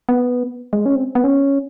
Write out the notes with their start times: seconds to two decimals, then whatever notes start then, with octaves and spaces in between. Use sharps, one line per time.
0.09 B3
0.73 G#3
0.86 C#4
0.95 C4
1.15 B3
1.24 C#4